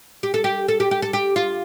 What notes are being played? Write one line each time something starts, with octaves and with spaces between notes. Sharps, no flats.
G4
A4
G4
A4
G4
G4
A4
G4
F4